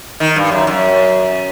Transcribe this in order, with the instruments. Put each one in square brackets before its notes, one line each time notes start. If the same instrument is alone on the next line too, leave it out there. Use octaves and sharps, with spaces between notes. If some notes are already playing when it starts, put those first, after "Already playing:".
[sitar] D#3
G2
F#2
F#2